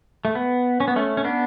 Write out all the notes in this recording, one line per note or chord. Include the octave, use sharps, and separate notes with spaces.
A3
B3
C#4
B3
A3 C#4
C#4
B3 D4